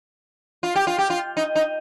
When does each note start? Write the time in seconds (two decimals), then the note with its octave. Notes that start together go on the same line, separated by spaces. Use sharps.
0.63 F4
0.75 G4
0.87 F4
0.98 G4
1.10 F4
1.37 D#4
1.56 D#4